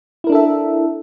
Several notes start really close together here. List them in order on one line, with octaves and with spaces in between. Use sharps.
E4 A#4 D4 A4 E5